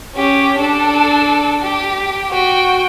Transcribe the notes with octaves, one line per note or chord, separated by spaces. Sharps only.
C#4 G4
D4 A4
G4
F#4 G5